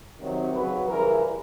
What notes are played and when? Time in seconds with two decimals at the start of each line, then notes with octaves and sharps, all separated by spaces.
0.20 C3 D#3 F#3
0.53 C#3 F#3 B4
0.87 C#3 E3 G3 A#4